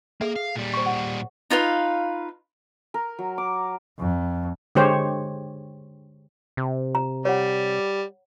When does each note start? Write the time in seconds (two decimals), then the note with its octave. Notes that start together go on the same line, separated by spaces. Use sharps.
0.21 A#3 G#4 A4 E5
0.36 F5
0.56 A#2 G3
0.74 C5 C#6
0.86 F#5
1.50 D#4 F4 B4 F5
2.94 A#4
3.19 F#3
3.38 D6
3.99 F2
4.75 D3 G#3 G4 C5 C#5
6.57 C3
6.95 A#5
7.25 G3 C#5 F#5